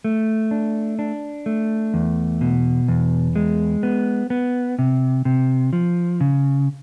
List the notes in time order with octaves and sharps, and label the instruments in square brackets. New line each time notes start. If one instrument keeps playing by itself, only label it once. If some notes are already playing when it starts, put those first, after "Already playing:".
[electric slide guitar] A3
D4
D4
A3
E2
B2
E2
G#3
B3
B3
C3
C3
F3
C#3